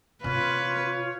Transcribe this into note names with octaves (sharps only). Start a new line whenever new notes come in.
C3 F4 B4 C#5 F5